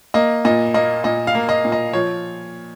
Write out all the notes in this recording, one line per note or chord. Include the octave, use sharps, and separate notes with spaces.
A#3 D#5
A#2 D#5
A#3 D#5
A#2 D#5
F5
A#3
D#5
A#2
D#5
F3 C#5